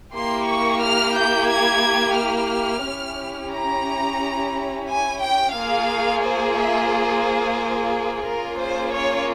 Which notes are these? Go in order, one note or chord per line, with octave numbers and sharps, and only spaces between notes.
A#3 E4 G4 C6
C#6
F6
G6
G#6
F6
C#4 E4 G4
A#5
G#5
G5
A#3 F4 G#4 F5
C5
E5
C5
A#3 C#4 F4 G#4 A#4
C5
C#5